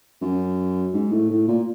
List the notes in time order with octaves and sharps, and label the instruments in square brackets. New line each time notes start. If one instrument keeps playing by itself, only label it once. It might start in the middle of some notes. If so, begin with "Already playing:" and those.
[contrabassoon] F#2
G#2
A2
A2
A#2